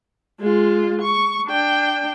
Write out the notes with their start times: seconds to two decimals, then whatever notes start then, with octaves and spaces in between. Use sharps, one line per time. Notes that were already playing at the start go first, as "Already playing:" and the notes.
0.40 G#3 F4
1.02 C#6
1.48 D4 G5